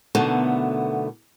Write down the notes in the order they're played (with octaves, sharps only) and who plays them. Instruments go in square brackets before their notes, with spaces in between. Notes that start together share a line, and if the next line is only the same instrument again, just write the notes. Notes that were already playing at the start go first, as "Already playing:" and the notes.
[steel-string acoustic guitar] B2 D3 D#3 F#3 A3 B3